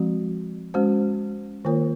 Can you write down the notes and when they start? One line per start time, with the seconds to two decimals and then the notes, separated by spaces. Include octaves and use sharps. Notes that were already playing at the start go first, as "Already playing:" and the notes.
Already playing: F3 G#3 C4 F#4
0.74 G#3 C#4 F#4 C5
1.65 D#3 A#3 F4 A#4 C#5